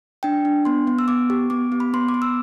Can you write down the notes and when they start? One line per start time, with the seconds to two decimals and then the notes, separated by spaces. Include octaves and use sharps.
0.23 D4 G5
0.45 D4
0.65 B3 C6
0.87 B3
0.99 E6
1.08 B3 D6
1.30 G4
1.50 B3 D6
1.72 B3
1.80 B5
1.94 B3 C6
2.09 D6
2.14 B3
2.22 E6